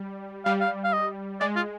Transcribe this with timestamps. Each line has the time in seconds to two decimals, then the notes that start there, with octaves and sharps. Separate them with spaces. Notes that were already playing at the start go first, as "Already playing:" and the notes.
Already playing: G3
0.45 G3 F5
0.61 F5
0.84 F5
0.93 D#5
1.41 G#3 D5
1.56 F4